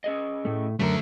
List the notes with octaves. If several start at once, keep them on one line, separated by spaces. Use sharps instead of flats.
C#4 G#4 D#5
A2 A3
F#2 D3 A3 A4 A#4